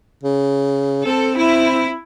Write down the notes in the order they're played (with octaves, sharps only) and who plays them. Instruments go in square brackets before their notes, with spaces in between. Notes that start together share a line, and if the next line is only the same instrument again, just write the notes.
[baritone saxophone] C#3
[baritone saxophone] C4 [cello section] A4
[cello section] E4